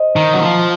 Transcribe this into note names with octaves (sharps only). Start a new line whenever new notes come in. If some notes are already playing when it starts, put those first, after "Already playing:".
Already playing: C5 D#5
D#3
F#3
F3